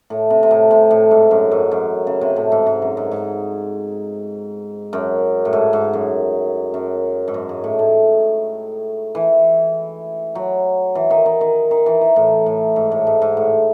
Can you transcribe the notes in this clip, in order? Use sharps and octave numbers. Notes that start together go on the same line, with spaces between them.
A2
C3
C3
A2
C3
A2
G#2
F#2
G#2
F#2
C#3
C3
A2
G#2
G#2
F#2
G#2
G#2
F#2
A2
G#2
G#2
F#2
F#2
G#2
F#2
G#2
A2
A2
E3
F#3
E3
D#3
D#3
D#3
D#3
E3
E3
A2
A2
G#2
A2
G#2
G#2
A2